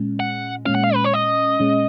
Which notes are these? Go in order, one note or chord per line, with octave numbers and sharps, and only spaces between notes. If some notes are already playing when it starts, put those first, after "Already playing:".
Already playing: A#2 G#3 C#4
F#5
A#2 G#3 C#4 F5
F#5
F5
B4
C#5
D#5
A#2 G#3 C#4